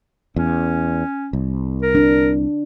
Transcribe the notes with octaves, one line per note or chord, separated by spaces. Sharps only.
E2 C#4
C2
A#4
D4